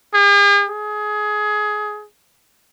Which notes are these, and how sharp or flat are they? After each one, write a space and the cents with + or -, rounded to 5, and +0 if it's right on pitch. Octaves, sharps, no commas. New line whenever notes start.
G#4 -45
G#4 +20